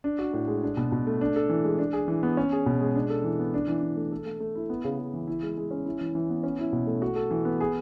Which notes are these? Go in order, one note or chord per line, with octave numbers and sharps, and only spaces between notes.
D4
F#4
A2
G#3
D4
B2
B2
A3
D4
A4
E3
G#3
D4
G#4
E3
B3
C#4
G#4
B2
G#3
D4
A4
E3
B3
D4
E3
E3
A3
A4
A3
A3
E4
B3
C#3
C#3
E3
E4
G#3
G#3
C#4
E4
E3
E3
B3
C#4
E4
B2
A3
F#4
A4
E3
B3
G#4